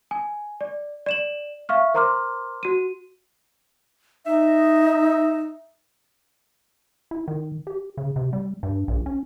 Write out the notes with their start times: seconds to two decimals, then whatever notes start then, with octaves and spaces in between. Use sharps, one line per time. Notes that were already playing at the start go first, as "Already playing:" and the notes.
0.11 G#5
0.61 D5
1.06 D5 E7 F#7
1.69 E5 F5 C#6 F6
1.94 A#4 C5 A#5 C6 D6 F6
2.63 F#4 D#7
4.26 D#4 E5
7.11 E4
7.28 D#3
7.67 G4
7.97 C#3
8.16 C3
8.33 G3
8.63 G2
8.88 A#1
9.06 C#4